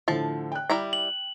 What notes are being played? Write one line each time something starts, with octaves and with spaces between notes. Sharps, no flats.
A2 D3 F3 A3 A5
G5 F#6
G3 E4 A#5
F#7